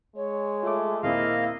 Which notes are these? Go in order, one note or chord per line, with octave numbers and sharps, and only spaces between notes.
G#3 C#5
A3 F4 D6
D#2 A#2 A#3 C4 E4 D#5 F5